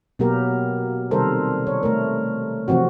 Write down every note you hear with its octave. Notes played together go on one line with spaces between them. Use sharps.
B2 F#3 A#3 B3 G4 A#4
C3 D#3 G3 A4 A#4 C5
C#5
A3 A#4
C3 E3 F3 C4 F#4